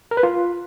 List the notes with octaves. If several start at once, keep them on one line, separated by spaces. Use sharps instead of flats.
A#4
B4
F4